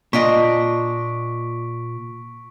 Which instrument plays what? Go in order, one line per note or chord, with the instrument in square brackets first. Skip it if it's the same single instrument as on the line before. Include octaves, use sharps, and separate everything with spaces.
[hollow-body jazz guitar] A#2 [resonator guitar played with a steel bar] D4 F4 D#5 [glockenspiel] C#6 B6 D7